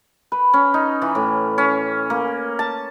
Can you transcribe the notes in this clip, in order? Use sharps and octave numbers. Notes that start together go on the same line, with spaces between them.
B4
C#4
D#4
E3
A2
C#4
A#3
A5